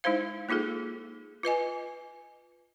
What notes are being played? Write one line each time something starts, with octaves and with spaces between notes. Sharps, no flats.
G#3 D#4 E4 C5 F5
A#3 D#4 F4 G#4 A4
F4 B4 D#5 G#5